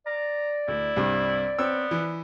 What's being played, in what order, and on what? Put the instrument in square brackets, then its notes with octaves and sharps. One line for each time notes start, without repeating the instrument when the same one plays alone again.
[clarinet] D5 [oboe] A#5
[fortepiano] D2 [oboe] E4
[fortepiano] C2 G2
[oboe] B3 [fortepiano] C4 C#5 E6
[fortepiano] E3